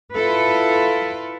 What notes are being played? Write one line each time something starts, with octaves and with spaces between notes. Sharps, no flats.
E4 F4 A4 B4